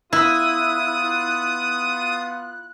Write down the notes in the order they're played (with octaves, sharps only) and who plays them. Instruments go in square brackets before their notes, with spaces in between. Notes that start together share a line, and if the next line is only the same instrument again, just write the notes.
[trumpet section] B3 F4 [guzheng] E4 [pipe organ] D#6 [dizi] F#6